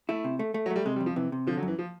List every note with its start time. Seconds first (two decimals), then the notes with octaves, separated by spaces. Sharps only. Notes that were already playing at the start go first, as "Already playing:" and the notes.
0.09 A3 E4
0.24 C3
0.39 A3
0.54 A3
0.66 F#3
0.70 A3
0.76 G3
0.86 C3 G#3
0.96 G3
1.01 F2
1.06 F3
1.16 C3 E3
1.32 C3
1.47 D3 F3
1.57 F#3
1.63 F#2
1.68 E3
1.79 F3